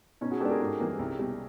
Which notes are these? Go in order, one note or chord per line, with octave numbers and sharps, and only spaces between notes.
B2 C#4 D#4
F#4 G#4
G#3 B3 D4 G4 A4
G#4 A#4
G#2
E3 G3 A#3
C2
B2 G3